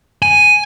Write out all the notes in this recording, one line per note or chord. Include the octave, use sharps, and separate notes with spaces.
G#5